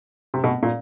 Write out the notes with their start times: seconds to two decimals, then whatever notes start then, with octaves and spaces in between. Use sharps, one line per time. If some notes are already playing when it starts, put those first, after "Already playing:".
0.34 C3
0.44 B2
0.63 A#2